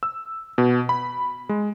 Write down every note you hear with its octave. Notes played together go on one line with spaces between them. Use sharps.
E6
B2
B5
G#3